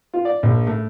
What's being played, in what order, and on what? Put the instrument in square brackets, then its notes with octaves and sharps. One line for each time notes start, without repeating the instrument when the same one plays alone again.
[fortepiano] F4
D5
A#1
A2